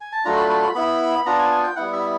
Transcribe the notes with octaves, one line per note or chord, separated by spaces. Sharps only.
G#5
A5
F#3 A3 D4 F4 A#5
B5
B5
B5
B3 E4 B5
B3 D4 F4 A#5
G#5
G#5
G5
G3 B3 E4 F#5
E5